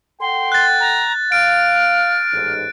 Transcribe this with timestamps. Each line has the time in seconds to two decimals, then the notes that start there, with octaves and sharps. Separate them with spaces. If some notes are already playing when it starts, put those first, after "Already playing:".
0.20 A4 F#5 G5 C6
0.52 F#6 A6
0.80 A#5
1.32 F5 F6 D7
2.33 A1 G#2